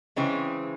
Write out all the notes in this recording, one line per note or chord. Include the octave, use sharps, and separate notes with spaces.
C#3 E3 G#3 C4